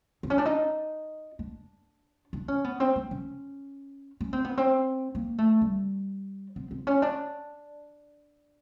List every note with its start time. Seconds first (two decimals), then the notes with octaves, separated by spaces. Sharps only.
0.23 C4
0.30 C#4
0.38 D4
0.45 D#4
1.39 D4
2.33 D4
2.48 C#4
2.64 B3
2.80 C4
2.96 C4
3.11 C#4
4.21 C#4
4.33 C4
4.45 B3
4.57 C4
5.15 A#3
5.38 A3
5.61 G3
6.56 C4
6.71 C4
6.87 C#4
7.02 D4